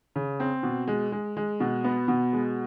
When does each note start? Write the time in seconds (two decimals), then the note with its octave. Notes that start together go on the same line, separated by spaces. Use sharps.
0.16 C#3
0.40 C4
0.63 B2
0.88 G#3
1.12 G#3
1.37 G#3
1.60 B2
1.84 B3
2.08 B2
2.33 G#3